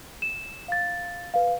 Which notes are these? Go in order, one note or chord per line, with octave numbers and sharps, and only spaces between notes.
E7
F5 A6
B4 F5